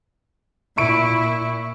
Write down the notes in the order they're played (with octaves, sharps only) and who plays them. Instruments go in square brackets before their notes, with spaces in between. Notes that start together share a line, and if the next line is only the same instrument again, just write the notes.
[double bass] A#2 E4 [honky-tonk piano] E5 C#6 D7